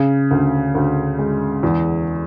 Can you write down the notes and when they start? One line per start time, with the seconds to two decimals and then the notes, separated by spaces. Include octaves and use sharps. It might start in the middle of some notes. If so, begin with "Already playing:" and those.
Already playing: C#3
0.31 D2
0.75 D2
1.19 G#3
1.63 E2